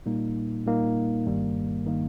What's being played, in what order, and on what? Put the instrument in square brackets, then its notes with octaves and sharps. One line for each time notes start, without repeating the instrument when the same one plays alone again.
[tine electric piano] A#2 G3 A#3 D#4
A#2 G3 A#3 D#4
G1 G2 D#3 G3 A#3
D#3 G3 A#3